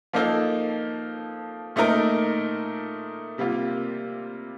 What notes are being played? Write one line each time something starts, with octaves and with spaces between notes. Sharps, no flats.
F3 A#3 D#4 A4
A#2 A3 D#4 A#4
C3 G3 A#3 F4